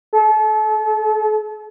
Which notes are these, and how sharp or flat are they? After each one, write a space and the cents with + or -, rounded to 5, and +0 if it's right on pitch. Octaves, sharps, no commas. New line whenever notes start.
A4 -35